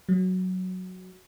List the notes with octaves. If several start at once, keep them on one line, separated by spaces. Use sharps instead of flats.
F#3